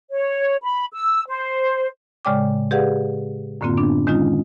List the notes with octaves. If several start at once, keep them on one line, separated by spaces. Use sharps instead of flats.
C#5
B5
E6
C5
A2 C#3 G#3 D5 G5 D6
G4 G#4 B4 D5 F5 F#5
F#2 A2 D3 A#3 C4 F4
B3 D4
D#3 G#3 C#4 D#4 F4